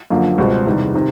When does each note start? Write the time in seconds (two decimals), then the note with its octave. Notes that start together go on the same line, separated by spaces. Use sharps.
0.10 F#1 F#2 D3 F3 A#3
0.38 C#2 B2 G3 C4
0.66 E2 C3 D#3 G3
0.94 C3 D#3